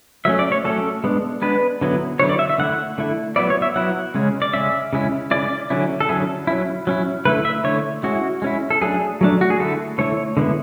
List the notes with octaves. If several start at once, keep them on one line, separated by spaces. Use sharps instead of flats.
F#3 A3 C#4 E5
D5
C#5
F#3 A3 C#4 A4
G#3 B3 D4
G#3 B3 D4 B4
D3 F#3 B3 E4
D3 F#3 B3 E4 C#5
D5
E5
E5
D3 A3 E4 F#5
D3 A3 E4
F#3 B3 E4 D5
C#5
E5
F#3 B3 E4 F#5
C#3 G#3 C#4
D5
C#3 G#3 C#4 E5
C#3 G#3 C#4 E4
C#3 G#3 C#4 E4 D5
D3 F#3 C#4 E4
A4
D3 F#3 C#4 E4 G#4
F#3 C#4 E4
F#3 C#4 E4
D3 A3 E4 B4
E5
D3 A3 E4 C#5
G#3 C#4 E4 F#4
G#3 C#4 E4
A4
F#3 A3 D4 G#4
F#3 A3 D4
F#4
G#4
D3 A3 E4 A4
D3 A3 E4 C#5
D3 G#3 B3 E4